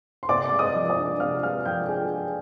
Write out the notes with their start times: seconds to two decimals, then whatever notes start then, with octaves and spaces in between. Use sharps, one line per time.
0.23 C6
0.29 C3 D5 D6
0.49 G#3 D6
0.59 D#5 D#6
0.75 F3
0.90 D5 D6
0.98 D4
1.20 C3 F5 F6
1.43 G#3 F5 F6
1.65 F3 G5 G6
1.88 D4 G#4 G#5